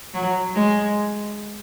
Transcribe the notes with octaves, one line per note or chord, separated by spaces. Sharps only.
F#3
G#3